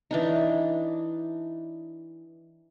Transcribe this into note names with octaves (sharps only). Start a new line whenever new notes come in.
E3 D4 D#4